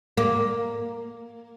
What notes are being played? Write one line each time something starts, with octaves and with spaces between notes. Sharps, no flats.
A#3